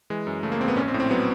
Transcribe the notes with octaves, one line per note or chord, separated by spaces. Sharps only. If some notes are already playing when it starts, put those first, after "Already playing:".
E3 G#3
F#2
C#3 A3
A#3
G#1 C4
B3
A#1 C#4
C4
A2
C4
F#3 B3